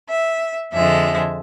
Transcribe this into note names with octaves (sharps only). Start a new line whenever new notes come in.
E5
F2 D3 F3 G#3 E5